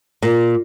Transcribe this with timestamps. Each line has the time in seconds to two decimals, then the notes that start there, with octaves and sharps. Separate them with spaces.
0.22 A#2